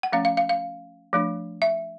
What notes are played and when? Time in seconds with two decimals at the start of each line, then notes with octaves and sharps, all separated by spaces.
0.03 F#5
0.12 F3 A3 C#4 F5
0.25 F5
0.37 F5
0.49 F5
1.13 F3 A3 D4
1.62 E5